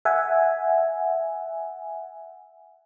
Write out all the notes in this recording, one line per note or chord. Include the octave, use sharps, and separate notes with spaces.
E5 F#5 G#5